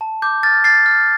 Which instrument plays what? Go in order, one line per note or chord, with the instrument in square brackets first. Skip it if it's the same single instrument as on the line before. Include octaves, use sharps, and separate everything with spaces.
[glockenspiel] A5
D6 G6
F6 A6
F6 A6 C7
F6